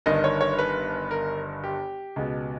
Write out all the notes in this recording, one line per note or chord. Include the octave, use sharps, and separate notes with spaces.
G1 G2 D#3 D#5
C#5
C#5
B4
A#4
G4
C#2 B2